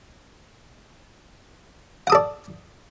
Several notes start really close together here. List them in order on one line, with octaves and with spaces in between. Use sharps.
F#5 D#6 A4 D5